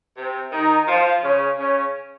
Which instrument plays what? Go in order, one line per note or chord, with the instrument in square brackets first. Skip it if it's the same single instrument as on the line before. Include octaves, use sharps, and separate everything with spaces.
[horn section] C3 C4
D#3 D#4
F3 F4
C#3 C#4
C#3 C#4